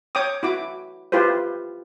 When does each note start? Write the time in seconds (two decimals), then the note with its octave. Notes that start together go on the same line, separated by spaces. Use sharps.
0.15 C#5 G5 D6 D#6
0.43 E4 F#4 D6
1.12 E4 F4 G4 B4 C5